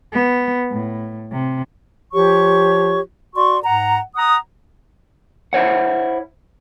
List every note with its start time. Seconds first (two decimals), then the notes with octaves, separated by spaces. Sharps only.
0.13 B3
0.70 A2
1.32 C3
2.13 F3 F4 G4 C#5 C#6
3.36 F#4 D5 C6 C#6
3.64 G#2 F#5 A#5
4.16 F#5 A#5 D#6
5.53 E4 C5 C#5 F#5